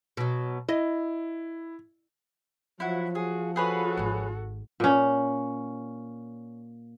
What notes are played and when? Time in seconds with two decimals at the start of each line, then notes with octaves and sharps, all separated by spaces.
0.17 B2 F#3
0.69 E4 D#5
2.80 F3 F#3 E4 F#4 F#5
3.15 F#4 G#4
3.56 F#4 G#4 A4 B4 C#5
3.97 G#1 G#3
4.80 A#2 C#4